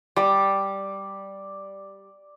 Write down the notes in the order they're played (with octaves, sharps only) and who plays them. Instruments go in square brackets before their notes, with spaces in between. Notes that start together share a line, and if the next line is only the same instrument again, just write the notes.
[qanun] G3 [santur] D5 D6